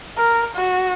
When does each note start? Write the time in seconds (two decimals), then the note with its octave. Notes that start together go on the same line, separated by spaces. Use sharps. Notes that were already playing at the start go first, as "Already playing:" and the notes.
0.17 A#4
0.55 F#4